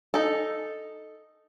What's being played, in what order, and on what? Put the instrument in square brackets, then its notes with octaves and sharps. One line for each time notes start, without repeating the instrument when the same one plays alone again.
[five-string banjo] D#4 A4